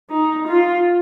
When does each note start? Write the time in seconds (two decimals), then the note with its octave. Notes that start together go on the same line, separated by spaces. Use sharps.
0.10 D#4
0.48 F4